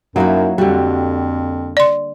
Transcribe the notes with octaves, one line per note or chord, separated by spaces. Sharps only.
F#2 F#3 A#3 D#4 E4 F#4
F2 D3 G3 F#4 G4
D5 C6